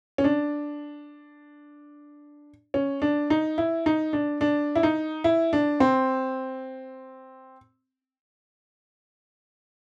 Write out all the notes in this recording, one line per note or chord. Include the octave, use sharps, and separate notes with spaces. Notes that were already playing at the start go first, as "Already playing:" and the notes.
C#4
D4
C#4
D4
D#4
E4
D#4
D4
D4
E4
D#4
E4
D4
C4